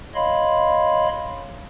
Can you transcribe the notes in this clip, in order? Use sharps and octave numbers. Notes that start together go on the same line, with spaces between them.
C#5 D#5 F5 B5 C6